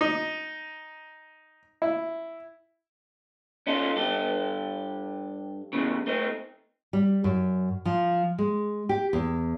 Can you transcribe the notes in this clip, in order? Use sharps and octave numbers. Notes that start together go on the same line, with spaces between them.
D#4
E4
C#4 D#4 F4 A4
G2 G4 A4
E2 A2 C#3
A3 C4 D#4
G3
F#2
F3
G#3
G4
E2